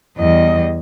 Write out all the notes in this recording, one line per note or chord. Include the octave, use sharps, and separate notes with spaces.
E2 G3 D#5